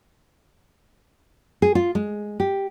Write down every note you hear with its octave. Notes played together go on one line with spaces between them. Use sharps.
G#4
F4
G#3
G4